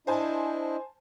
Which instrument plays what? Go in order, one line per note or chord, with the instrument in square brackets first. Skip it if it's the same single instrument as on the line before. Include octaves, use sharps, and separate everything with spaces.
[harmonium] D4 E4 D#5 [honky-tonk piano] C5 G#5 A5